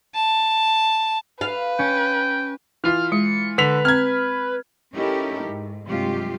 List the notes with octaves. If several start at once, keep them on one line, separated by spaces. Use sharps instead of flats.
A5
B4 F5
C#4 G5
E3 F4 F6
G#3 C#7
D3 B4 B6 F7
C4 A#5 F6 G#6
C#4 D#4 E4 G4 A4 A#4
G#2
G2 C3 F#3 G#3 F4 G4